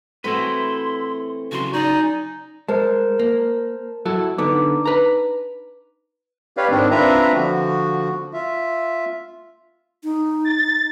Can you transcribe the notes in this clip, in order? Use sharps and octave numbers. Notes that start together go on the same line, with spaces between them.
E3 A3 C4 E4 F#4 B4 C6
C#3 F#3 F#4 C6
D#4 D5 G#5
G#3 A#4 C5 A5
A#3
F#3 E4 A4
D3 B3 D4 D#4 D6
B4 A#5
G4 B4 C#5 D5 F5
G#2 D#3 C4 D4
C4 D4 F4 B4 E5 A#5
D3 F3 F#4
F4 E5
D#4
A6